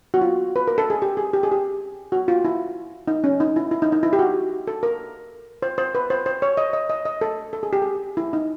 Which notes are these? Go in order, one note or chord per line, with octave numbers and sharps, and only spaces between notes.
F#4
F4
B4
A#4
A4
G#4
G4
G#4
G4
G#4
G4
F#4
F4
E4
D#4
C#4
D#4
E4
E4
D#4
D#4
E4
G4
F#4
A4
A#4
C5
C5
B4
C5
C5
C#5
D#5
D#5
D#5
D#5
A4
A4
G#4
G4
G#4
E4
D#4